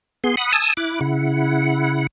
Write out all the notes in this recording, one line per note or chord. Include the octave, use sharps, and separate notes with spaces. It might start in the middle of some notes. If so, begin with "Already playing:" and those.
B3 G#4 C6
F#5 B5 D#6
G#5 A5 D#6 E6
E4 D6 F#6
C#3 E4 F#5